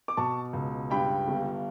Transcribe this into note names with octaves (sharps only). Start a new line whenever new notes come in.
D6
B2 A5 C#6
C#2
G2 G5 B5
G1